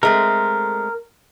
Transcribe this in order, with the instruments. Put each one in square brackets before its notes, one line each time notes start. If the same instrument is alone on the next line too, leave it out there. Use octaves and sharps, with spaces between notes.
[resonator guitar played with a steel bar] G#3 A3 C4 [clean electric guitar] A#4